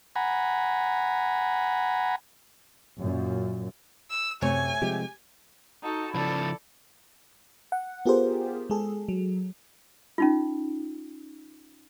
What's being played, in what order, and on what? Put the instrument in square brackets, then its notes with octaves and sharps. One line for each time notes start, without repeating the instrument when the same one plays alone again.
[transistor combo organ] F#5 G#5 A#5 B5
[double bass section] F#2 A#2
[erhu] E6
[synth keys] F#2 C3 [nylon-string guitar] A3 C#5 [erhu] G#5
[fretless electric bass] C3 F3 G#3 [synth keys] G4
[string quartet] D#4 F#4 A4
[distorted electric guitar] C#3 F3 [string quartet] E4 A4 D5
[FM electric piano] F#5
B3 F4 G4 G#4 A#4 C5
G#3 G#4 A4
F#3
[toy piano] C#4 D#4 F4